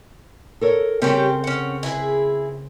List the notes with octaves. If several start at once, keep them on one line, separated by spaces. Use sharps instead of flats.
A4 A#4 C#5
C#3 G3 C4 G4 A#4 C#5
C#4 F#5
E4 G#4 B4